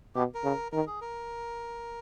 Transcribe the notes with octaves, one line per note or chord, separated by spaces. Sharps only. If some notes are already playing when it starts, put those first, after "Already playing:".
B2 G4
A#4
C#3
D#3 A#4
G#4
A#4